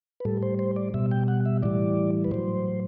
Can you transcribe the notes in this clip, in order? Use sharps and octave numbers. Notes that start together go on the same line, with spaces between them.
B4
A2 G3 A4
C5
C5
D5
B2 G3 E5
G5
F#5
E5
A2 E3 G3 D5
B4
A2 F#3 C5